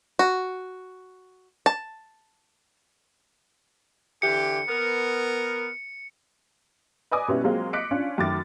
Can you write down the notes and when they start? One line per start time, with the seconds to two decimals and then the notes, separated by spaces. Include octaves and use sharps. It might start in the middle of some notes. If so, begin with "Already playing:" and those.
0.19 F#4
1.66 A5
4.22 D3 E3 G4 C#7
4.68 B3 A#4
7.11 B4 D5 D#5 G#5 D6 D#6
7.28 B2 G3 B3 C#4 E4
7.44 F#3 G#3 A#3 C4 F4
7.73 D#5 D6 F#6 B6 C#7 D7
7.91 C#4 D4 F4
8.18 F#2 D#3 A3 D6 A6